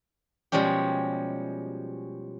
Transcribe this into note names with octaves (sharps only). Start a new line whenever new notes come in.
B2 F3 G3 G#3 C#4 G4